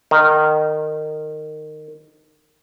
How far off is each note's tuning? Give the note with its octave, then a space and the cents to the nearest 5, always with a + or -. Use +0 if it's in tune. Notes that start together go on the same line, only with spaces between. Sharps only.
D#3 -25